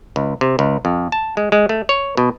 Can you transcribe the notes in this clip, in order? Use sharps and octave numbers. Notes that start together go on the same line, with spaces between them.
C#2
C3
C#2
F2
A5
G#3
G#3
A3
C#5
B2